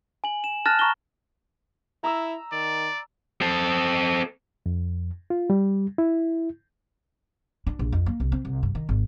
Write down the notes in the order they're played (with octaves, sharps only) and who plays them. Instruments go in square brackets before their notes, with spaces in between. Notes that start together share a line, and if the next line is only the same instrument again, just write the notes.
[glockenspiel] G#5 F#7
E7
A5 F6 F#6 A6 A#6 E7
A#5 C#6 A#6 G7
[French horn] E4 [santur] A#5 E6
[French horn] D#3 [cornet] D5
[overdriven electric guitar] C4 A4
[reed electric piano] F2
F4
G3
E4
[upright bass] D4
A#1
F2
A#3
C2
C4
C2
G2
D#3
G#1